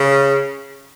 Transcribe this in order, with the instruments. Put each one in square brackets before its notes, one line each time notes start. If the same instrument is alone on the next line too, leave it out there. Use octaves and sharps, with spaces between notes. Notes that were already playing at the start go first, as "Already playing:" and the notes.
Already playing: [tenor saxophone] C#3